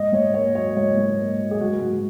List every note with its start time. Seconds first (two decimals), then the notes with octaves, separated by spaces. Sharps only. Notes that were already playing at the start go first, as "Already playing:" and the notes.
Already playing: G#2 D#5
0.13 G#2 C#5
0.34 A#3 C#5
0.55 F#3 C#5
0.76 G#2 C#5
0.97 G#2
1.18 A#3
1.40 F#3
1.51 G#4
1.61 G#2 F#4
1.81 G#2 F#4